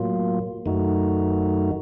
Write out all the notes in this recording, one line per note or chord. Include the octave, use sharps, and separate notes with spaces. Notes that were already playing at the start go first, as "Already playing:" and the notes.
Already playing: A2 F#3 A#3 F4
F#2 D#3 A3 D#4 F#4